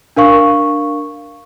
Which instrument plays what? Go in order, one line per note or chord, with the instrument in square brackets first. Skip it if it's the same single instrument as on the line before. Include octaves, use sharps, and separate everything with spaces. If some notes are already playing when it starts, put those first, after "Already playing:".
[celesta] D4 A#4 F5 C#6